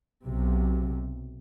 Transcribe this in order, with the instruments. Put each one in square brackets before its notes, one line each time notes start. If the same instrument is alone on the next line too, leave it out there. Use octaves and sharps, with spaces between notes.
[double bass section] B1 C3